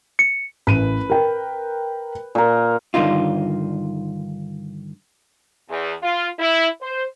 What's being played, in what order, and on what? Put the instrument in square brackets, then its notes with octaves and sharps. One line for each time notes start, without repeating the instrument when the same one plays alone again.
[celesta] C#7
[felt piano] A1 D#7 [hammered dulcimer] B4
[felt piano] A#4 G5
[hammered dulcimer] A#2 A#4
[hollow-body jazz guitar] G2 D3 D#3 D#4 F4
[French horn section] E2
F4
E4
C5